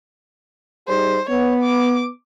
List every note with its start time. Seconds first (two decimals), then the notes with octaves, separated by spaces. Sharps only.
0.88 G3 D#4 G#4 C5
1.29 B3 C#5
1.63 D6